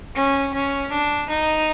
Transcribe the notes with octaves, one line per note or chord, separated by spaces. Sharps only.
C#4
C#4
D4
D#4